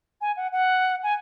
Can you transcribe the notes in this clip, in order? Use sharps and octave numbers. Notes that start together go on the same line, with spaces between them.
G#5
F#5
F#5
G#5